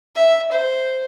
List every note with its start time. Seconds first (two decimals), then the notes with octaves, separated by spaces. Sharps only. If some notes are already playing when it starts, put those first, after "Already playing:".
0.15 E5
0.52 C5